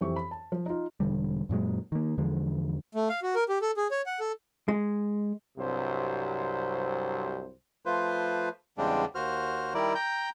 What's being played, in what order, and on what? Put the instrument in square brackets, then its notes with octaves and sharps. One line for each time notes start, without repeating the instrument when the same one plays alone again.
[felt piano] F2 E3 C4 G4 C#6
B5
A5
F3
D#4 F4
[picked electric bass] E1 D3 G3
F#2 A#2 F#3 G#3
D#3 A#3
E2 D3 F3 G#3
[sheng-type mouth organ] A3
F5
F#4
A#4
G4
A4
G#4
C#5
F#5
A4
[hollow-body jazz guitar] G#3
[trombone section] C2 G2 C3 F#3 C5
[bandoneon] F3 A3 F4 B4 C5
E2 C#3 G3 G#3 C4 D4
D#2 F#4 C5 F6
D#3 G3 E4 A#4 D5
G5 A#5 G6